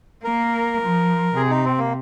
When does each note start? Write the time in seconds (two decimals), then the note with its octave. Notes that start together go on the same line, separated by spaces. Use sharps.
0.24 A#3 A#4
0.81 F3
1.36 C3 G#4
1.50 D#4
1.65 C4
1.78 A#3